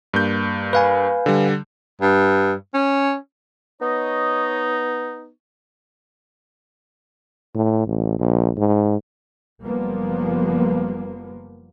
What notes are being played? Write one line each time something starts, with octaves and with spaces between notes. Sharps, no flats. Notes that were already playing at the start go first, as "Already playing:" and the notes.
G2 A#3 G6
B4 F5 G#5
D3 G3
G2
C#4
B3 D#4 C#5 D#5
A2
A1
A#1
G#2
F#1 F3 G3 A#3 B3